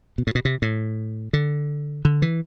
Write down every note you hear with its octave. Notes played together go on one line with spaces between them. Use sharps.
B2
A2
B2
C3
A2
D3
D3
E3